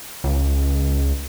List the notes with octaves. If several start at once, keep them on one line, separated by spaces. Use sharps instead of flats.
C#2